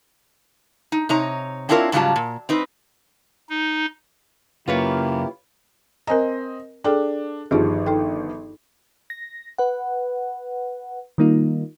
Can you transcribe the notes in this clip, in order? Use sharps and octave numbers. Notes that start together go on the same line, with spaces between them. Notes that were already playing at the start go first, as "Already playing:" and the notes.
D#4
C3 D#4 C#5 A#5
C4 D4 E4 F4 A#4 C#5
G#2 C#3 F#3 G3 F4 A5
A#2
C4 D#4 B4
D#4
F#2 C#3 A#3 E4 F4 G4 B4 C#5
C4 A#4 D#5 G#5 A#5
D4 G#4 A4 G5
G1 D#3 F3 F4 G4 G#4
D#4 A4 G5
A#6
B4 F#5
D#3 G3 A#3 D#4 F4